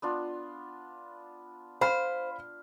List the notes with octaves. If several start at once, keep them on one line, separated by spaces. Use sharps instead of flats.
B3 D4 F4
C5 F5 B5 F6